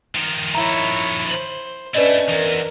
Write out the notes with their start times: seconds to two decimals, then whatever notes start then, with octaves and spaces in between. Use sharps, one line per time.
0.15 D#3 F3
0.55 E4 C#5 A#5
1.30 C5 F#7
1.95 A3 C#4 D4 E4 B4 D5 D#5
2.29 E2 A#4